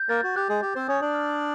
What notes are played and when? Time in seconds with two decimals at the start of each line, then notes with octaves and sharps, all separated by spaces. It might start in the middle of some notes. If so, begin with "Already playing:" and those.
Already playing: G6
0.09 A#3 A#4 A6
0.23 F#4
0.36 G4 F#6
0.49 G#3 G#4
0.62 G4 G6
0.75 C4 C5
0.88 C#4 C#5 D#6
1.01 D4 D5
1.15 F6